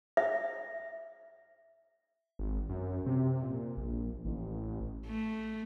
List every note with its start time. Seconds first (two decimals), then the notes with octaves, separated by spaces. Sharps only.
0.17 E5
2.39 G#1
2.69 F#2
3.06 C3
3.42 A#2
3.77 A#1
4.25 A1
5.06 A3